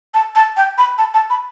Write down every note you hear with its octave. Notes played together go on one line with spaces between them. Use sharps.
A5
A5
G5
B5
A5
A5
B5